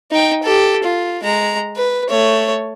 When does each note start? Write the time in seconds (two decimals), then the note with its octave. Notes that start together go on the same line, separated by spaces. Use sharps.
0.11 D#4 G5
0.43 G4 A4
0.83 F4
1.23 G#3 A#5
1.76 B4
2.09 A3 C#5